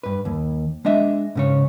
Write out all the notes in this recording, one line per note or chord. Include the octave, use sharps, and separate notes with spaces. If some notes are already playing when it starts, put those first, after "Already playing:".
G2 B4
D#2
G#3 D4 D#5 E5
G#2 C#3 C#5